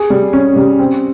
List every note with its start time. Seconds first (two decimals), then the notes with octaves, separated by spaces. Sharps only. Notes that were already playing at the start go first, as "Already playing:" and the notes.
Already playing: G#4
0.10 G3
0.33 C#4
0.56 G3
0.79 C4